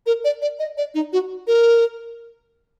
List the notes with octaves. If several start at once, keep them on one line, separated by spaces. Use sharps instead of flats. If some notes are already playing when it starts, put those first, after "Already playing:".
A#4
D5
D5
D#5
D5
D#4
F#4
A#4